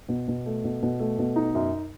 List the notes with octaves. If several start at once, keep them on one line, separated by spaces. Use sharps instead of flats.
B2
B2
A3
B2
B2
A3
B2
D#4
F#2